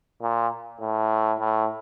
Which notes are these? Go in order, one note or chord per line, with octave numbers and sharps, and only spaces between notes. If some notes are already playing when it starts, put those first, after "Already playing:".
A#2
A2
A2